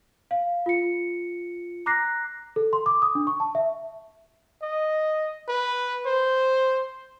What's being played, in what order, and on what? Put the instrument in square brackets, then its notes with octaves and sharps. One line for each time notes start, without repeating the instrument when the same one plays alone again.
[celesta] F5
F4 C#7
A#5 D6 F#6 A#6 C7
A4
C6
D6
D#6
D4
C#6
A5
E5
[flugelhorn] D#5
B4
C5